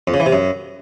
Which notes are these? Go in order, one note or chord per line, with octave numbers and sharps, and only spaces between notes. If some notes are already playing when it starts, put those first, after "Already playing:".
F2
C#3
E3
C3
F#2